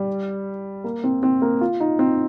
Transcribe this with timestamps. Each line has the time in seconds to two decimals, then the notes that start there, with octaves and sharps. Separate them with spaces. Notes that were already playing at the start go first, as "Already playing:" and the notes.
Already playing: G3
0.84 A#3
1.04 C4
1.23 C4
1.42 A#3
1.61 F4
1.80 D#4
1.99 C4